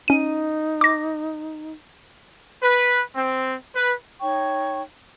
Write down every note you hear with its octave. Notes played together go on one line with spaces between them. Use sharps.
C#4 D#4 D#7
D6 A#6
B4
C4
B4
D#4 C#5 G5 C#6